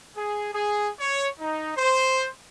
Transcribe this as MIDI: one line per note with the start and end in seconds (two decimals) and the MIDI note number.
0.17 0.49 68
0.53 0.90 68
1.00 1.28 73
1.40 1.71 63
1.76 2.27 72